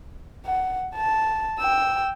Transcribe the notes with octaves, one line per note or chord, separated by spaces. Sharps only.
F#5
A5
G5 E6